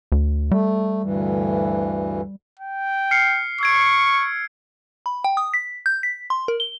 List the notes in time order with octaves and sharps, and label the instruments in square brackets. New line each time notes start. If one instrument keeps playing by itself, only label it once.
[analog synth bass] D2
[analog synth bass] G3 [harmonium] A3
[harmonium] D2 G2 E3
[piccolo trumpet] G5
[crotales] F6 C7 C#7
[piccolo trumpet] C#6 [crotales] E6 G#6 D7
[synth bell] B5
G5
D#6
B6
G6
B6
C6
A#4
G7